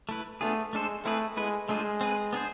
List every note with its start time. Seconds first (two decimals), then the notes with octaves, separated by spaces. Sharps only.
0.09 A3 E4 B4
0.41 A3 B3 D4 F4 G#4
0.73 G#3 A3 D4 A4 C5
1.04 A3 C4 E4 G#4 B4
1.36 G#3 B3 E4 B4
1.68 G#3 A3 D4 F4 G#4 C5
2.01 C4 G#4 B4
2.33 B3 D4 G#4 C5